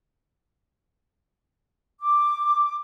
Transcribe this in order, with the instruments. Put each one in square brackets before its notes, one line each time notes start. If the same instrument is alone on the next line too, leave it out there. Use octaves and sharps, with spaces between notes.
[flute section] D6